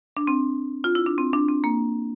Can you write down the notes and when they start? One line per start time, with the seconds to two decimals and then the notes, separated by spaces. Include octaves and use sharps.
0.17 D4
0.27 C4
0.84 F4
0.95 E4
1.06 D4
1.18 C4
1.33 D4
1.49 C4
1.64 A#3